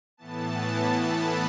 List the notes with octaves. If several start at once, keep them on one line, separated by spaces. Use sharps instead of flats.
A2 E3 B3 A5
A5
B5